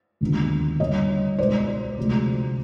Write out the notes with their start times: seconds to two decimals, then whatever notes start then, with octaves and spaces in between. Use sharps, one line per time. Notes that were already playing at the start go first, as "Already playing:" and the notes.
0.21 D#2 D3 F3 G#3 B3
0.80 G2 D3 G3 C#5 D#5
1.38 C#2 B2 G#3 C5 D5
1.98 D2 C3 F3 G#3